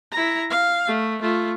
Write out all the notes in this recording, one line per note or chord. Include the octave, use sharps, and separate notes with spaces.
E4 A#5
F5
A3
A3 F4